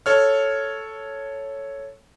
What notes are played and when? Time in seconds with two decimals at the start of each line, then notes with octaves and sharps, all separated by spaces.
0.06 A4 C#5 F6